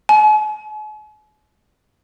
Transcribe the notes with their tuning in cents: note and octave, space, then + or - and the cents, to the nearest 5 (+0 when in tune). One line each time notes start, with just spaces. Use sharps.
G#5 +45